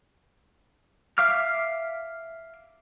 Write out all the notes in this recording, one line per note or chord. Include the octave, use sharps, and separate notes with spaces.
E5 F5 D6 F6